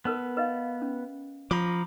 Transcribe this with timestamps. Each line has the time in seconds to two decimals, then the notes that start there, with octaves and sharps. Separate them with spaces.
0.05 B3 A#4 B4 A5
0.37 B4 D#5 F5
0.82 C#4
1.51 F3 A#5 B5 D6